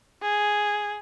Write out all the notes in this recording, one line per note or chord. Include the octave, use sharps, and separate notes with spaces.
G#4